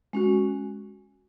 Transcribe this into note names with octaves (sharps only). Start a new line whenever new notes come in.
G#3 C#4 F#4